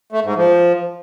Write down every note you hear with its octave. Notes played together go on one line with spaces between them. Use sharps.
A3
G#2
F3